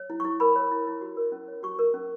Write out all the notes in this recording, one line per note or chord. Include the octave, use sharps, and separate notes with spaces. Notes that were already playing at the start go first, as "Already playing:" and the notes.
Already playing: C#5
E4
E4 C#6
A#4 B5
C#5
E4
E4
F#4
A#4
C#4
C#5
F#4 C#6
A#4
C#4